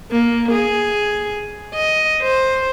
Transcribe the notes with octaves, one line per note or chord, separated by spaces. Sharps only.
A#3
G#4
D#5
C5